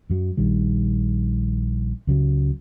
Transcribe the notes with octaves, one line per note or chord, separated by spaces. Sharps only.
F#2 F#3
A#1 D#3 G3
C#2 C#3 F#3